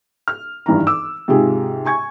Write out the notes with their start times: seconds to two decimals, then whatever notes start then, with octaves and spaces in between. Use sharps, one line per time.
0.28 F6
0.66 G#1 G2 E3 A#5
0.87 D6 E6
1.28 G#2 C3 F4 G4 G#4
1.86 G#5 C#6 G#6